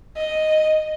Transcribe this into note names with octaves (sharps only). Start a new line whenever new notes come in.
D#5